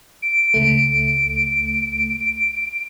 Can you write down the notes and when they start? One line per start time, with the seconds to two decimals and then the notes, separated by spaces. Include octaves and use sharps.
0.22 D7
0.54 C#2 A3